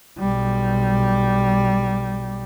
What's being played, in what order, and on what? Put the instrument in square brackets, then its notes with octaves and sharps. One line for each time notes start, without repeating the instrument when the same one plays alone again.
[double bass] B1 G3